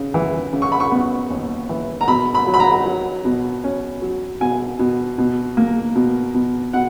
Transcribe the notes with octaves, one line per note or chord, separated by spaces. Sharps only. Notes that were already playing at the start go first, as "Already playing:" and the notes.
Already playing: C#3
E3
C#3
C#6
B5
C#6
B3
D#2
E3
A#5
B2 B5
B5
F#3
B5
A#5
F#3
B2
C#4
F#3
B2 G#5
B2
B2
A#3
B2
B2
B2 F#5